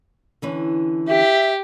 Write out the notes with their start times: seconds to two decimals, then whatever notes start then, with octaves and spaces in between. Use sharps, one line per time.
0.42 D3 E3 C#4
1.08 G4 E5